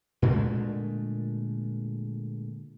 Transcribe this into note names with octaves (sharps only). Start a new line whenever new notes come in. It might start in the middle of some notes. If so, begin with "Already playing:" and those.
A#2 D3 G#3 A3